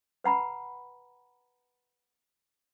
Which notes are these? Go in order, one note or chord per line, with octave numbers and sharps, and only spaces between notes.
B4 F#5 A#5 B5